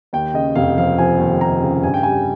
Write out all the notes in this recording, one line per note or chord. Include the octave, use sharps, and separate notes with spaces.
D#2 G5
C#3 D#5
F1 F5
F3 F5
F3 G#5
D#2
D#2 A#5
C#3
G2 G#5
G5
G3 G#5